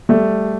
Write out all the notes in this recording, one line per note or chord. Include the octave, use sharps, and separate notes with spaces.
G3 A3